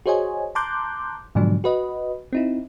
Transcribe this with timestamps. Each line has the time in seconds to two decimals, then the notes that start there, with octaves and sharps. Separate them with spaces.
0.06 F#4 G#4 C5 C#5 D#5 G#5
0.55 A5 A#5 C6 D6 F#6 G6
1.35 G#2 B2 D3 F3 F#3 D4
1.64 F#4 B4 D#5
2.33 C4 D#4 E4